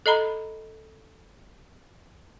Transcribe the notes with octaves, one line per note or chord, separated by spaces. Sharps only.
A4 D#5 A#5 B5